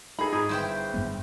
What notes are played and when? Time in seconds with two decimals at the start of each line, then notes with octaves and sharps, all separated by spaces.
0.19 D#4 G#4 A4 B5
0.33 G#2 G#4
0.49 G1 E4 C5 G5
0.94 G2 G3 B3